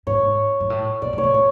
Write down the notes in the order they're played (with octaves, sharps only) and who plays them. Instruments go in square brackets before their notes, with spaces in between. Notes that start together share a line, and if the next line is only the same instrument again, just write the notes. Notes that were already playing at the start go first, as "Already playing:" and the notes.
[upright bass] G#2 [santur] C#5
[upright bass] G#2
A2
[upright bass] A#2 [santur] D5
[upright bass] A2
[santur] C#5
[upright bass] A2
[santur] C#5